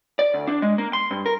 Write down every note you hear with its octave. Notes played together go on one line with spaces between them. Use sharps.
D5
D2
D4
G#3
A#3
C6
G2
A#4